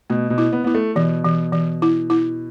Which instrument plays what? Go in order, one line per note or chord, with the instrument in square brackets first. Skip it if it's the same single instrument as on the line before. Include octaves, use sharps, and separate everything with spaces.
[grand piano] B2 [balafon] A3
[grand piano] B2
[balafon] E4
[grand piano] B3
[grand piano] B3 [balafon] E4
[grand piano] A3
[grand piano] B2 [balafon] E3
[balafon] E3
E3
E4
E4